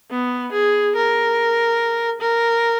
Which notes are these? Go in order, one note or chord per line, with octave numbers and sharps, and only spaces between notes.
B3
G#4
A#4
A#4